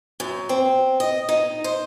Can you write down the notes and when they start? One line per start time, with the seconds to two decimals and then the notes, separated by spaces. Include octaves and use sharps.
0.20 F#2
0.49 C4
1.00 D#5
1.29 D#4
1.64 C5